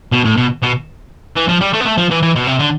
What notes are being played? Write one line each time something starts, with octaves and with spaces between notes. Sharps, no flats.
B2
A2
B2
B2
E3
F3
G3
A3
B3
A3
F3
E3
E3
B2
C3
D3